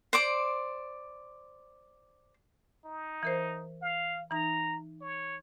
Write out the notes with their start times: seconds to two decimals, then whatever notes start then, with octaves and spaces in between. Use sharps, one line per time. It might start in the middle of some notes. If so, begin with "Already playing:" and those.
0.13 C5 D5 D6
2.85 D#4
3.23 E3 A#4 C5
3.82 F5
4.31 E3 D#4 A#5
5.01 C#5